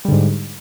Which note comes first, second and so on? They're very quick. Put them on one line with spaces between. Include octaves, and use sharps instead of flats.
G3 D3 G#2